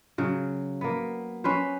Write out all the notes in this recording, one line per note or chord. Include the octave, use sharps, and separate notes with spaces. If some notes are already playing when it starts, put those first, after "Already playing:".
C#3 F#3
A#3 B3
B3 C#4 B4 C5